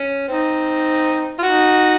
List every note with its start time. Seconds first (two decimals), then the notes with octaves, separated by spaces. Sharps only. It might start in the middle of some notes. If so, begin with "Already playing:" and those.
Already playing: C#4
0.28 C4 D#4
1.39 F4
1.43 D#4 F#4